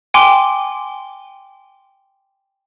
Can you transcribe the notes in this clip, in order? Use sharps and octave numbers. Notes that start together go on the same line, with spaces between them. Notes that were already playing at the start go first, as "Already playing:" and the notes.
G5 G#5 C6 D6 G7